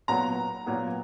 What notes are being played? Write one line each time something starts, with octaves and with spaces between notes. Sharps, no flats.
A#2 F#3 B3 A#5
A#2 F#3 B3